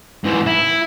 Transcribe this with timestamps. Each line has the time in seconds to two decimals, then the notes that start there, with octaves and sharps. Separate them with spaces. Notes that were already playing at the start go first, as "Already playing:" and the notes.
0.24 G#2 E3
0.47 E4